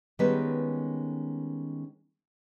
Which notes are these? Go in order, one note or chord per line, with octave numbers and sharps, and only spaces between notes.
D#3 G3 G#3 B3 C#4 B4